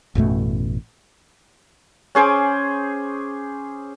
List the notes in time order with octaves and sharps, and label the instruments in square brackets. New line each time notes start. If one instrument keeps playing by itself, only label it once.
[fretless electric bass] A1 F#2 B2 A3
[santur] C#4 G#4 C5 D6